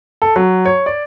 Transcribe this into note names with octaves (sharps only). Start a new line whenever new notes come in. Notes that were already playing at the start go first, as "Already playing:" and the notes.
A4
F#3
C#5
D5